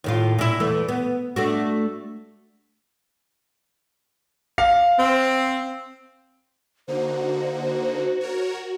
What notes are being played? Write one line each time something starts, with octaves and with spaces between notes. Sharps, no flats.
D#2 A2 F4
A#2 E4
E2 E3 A3
B3
A3 D4 F#4
F5
C4
D3 A#3 D#4 F#4 C5
A#4 C#5